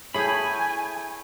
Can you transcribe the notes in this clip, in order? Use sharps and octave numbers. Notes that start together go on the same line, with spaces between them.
A3 E4 G#4 C#5 G5 G#5 B5